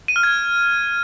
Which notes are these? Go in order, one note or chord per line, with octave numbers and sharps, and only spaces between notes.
D#7
F6
G#6